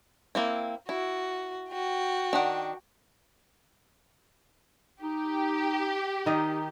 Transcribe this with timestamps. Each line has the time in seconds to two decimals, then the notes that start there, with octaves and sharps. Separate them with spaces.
0.35 A#3 C4 E4
0.89 E4 F#4
1.72 F#4 G5
2.33 D#3 D4 F#5
5.02 D#4 G4
6.26 D#3 D#4 D#5